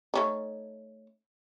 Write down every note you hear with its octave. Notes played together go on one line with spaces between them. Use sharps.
A3 C#4 D#4